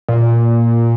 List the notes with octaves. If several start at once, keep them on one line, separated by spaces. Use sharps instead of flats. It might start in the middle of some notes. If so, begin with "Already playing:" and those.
A#2